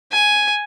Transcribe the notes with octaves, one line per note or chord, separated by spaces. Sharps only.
G#5